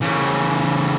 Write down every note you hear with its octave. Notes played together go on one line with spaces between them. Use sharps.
C#3 E3